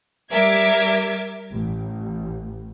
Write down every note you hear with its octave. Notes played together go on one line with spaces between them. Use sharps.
G3 A#4 E5 D6 G#6
A1